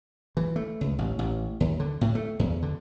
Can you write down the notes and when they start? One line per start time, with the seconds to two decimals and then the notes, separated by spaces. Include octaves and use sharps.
0.37 E3
0.56 A3
0.81 C#2
0.98 A1
1.19 A1
1.60 D#2
1.80 D3
2.01 A2
2.15 A3
2.39 E2
2.62 D3